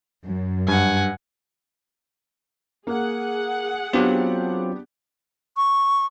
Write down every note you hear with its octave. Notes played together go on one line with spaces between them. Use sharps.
F#2
G2 F#5 G#5
A#3 G#4 F#5
F#3 B3 C4 D4 F4 G4
C#6